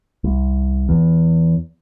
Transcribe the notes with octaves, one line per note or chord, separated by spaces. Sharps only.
C2
E2